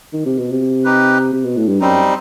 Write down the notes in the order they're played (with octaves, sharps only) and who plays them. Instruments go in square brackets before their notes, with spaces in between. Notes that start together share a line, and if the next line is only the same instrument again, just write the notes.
[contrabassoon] D#3
C3
B2
C3
[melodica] D#4 G4 B4
[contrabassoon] C3
B2
A2
G2
[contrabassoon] F#2 [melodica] G3 C4 D#4